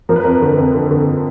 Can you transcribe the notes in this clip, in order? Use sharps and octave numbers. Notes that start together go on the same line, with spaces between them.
F3 A#4
B4
F2 A#4
D3
F2
D3
D3